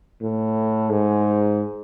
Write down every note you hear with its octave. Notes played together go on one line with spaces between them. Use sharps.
A2
G#2